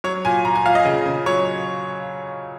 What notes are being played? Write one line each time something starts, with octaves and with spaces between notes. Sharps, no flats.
F#3 C#5
A#2 G#5
A#2 A#5
G#5
A#2 F5
D#5
C#3
C#3
F#3 C#5